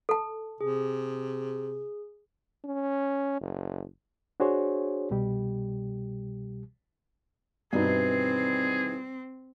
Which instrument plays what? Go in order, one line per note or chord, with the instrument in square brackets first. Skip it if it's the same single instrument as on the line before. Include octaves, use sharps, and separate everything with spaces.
[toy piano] A4 A5
[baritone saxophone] C3 [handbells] G#4
[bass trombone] C#4
F#1
[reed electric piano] D4 F#4 G#4 C5 C#5
C2 B2 G3 G4
[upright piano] G2 B2 D#4 [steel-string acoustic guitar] D#3 E3 G3 [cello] C4 [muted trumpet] G#4